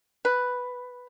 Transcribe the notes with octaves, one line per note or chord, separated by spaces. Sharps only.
B4